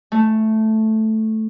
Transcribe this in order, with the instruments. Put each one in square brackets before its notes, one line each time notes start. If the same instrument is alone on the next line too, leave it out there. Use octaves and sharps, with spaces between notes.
[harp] A3